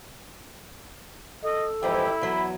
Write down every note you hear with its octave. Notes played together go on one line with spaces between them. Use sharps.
A4 D#5
F2 G#2 E3 E4 G4
E2 F#3 B5